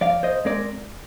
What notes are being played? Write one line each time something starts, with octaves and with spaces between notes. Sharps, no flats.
F3 D5 F5
C5 D#5
G#3 C4 A#4 D5